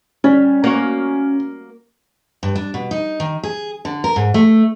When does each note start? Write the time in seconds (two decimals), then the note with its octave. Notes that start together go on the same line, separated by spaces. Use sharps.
0.24 G3 C#4
0.64 A#3 F#4 C#5
2.43 G2
2.56 D4
2.74 B2
2.91 D#4
3.20 D#3
3.43 G#4
3.85 D3
4.04 A#4
4.16 G#2
4.34 A3